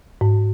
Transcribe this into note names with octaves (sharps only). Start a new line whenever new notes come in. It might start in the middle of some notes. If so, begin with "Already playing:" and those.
G#2